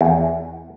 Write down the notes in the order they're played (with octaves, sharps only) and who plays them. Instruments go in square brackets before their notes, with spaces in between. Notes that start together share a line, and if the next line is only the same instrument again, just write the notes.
[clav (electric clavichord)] E2